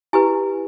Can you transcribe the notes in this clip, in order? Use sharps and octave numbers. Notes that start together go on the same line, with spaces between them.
E4 G4 B4 G#5